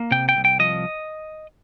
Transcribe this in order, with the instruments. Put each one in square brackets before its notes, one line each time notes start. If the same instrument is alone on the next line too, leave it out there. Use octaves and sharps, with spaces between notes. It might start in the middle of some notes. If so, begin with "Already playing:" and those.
Already playing: [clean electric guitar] A#3
C3 G5
G5
C2
G5
F3 D#5